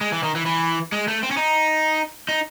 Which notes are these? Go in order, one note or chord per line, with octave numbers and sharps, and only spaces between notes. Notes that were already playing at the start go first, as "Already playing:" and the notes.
G#3
E3
D#3
E3
E3
G#3
A3
C4
C#4
D#4
D#4